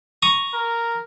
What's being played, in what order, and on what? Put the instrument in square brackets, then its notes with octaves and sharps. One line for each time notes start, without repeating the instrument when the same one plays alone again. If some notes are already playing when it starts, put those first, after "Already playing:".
[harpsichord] A#5 C#6 D#6
[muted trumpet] A#4